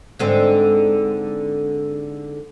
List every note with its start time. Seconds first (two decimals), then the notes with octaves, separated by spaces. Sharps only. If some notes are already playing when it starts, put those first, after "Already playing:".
0.19 G#2 D3 C4